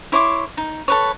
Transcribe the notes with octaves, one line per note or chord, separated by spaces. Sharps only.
E4 C#5 C6 D6
D#4
A4 B4 C#5